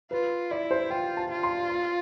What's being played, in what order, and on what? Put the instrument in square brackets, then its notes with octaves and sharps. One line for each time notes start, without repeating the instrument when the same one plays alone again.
[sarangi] F4 [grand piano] B4
[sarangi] E4 [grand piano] D5
[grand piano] C5
[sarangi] F4 [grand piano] G5
[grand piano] A5
[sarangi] F4
[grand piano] C6
C6